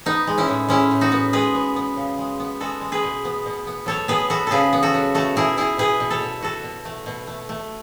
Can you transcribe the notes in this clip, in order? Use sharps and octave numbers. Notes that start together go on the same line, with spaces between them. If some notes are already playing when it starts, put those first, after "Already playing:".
B3 D#4
G#3
C#4 E4
A2
G#3 C#4 E4
A2
D#4 F#4
B3
G#3 G#4 B4
B3
B3
C#3
G#3
B3
G#3 F#4 A4
G#3
G#4 B4
B2
B3
B2
B3
F#3 A4 C#5
B3 G#4 B4
B3 F#4 A4
C#3 G#4 A4 B4
B3
F#4 A4
F#3
A3 F#4 A4
B2 E4 G#4
B2 E4 G#4
B2 G#4 B4
B2
A4 C#5
B2
B2 F#4 A4
B2
A3
B2
A3
A3